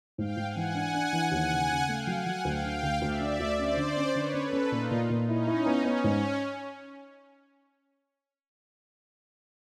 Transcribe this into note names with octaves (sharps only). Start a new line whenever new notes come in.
G#2 F5 G5
G#2
F#5 G#5
E3
D4
D4
E3
D#2 F#5 G#5
C#3
C#3
A3 F5 G5
F#3
F#5 G#5
F#3
D2 F5 G5
D3
D2
D2 D5 E5
D3
D2
C#4 C5 D5
D3
C#4
D3 B4 C#5
C#4
A4 B4
C#4
A#2 D#4 F4
A#2
A#2
C#4 D#4 E4
E4
B3
B3 C#4
G#2